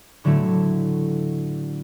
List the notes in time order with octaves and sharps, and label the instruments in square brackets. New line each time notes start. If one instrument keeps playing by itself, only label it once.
[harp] A2 D3 F#3 A3 E4